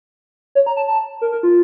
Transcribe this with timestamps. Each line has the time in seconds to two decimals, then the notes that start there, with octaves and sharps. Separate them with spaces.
0.55 C#5
0.66 A#5
0.76 A5
0.87 A5
1.21 A#4
1.32 A#4
1.43 F4